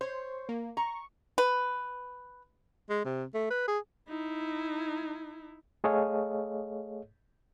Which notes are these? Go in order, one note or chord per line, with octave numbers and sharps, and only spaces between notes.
C5 C#5
A#3
A#5 C#6
B4
G#3
C3
A3
B4
G#4
D#4 E4
A3 G#4 A4 C#5 D#5 F5